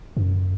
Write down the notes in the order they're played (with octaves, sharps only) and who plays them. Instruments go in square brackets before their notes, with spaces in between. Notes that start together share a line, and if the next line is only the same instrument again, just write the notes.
[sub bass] F#2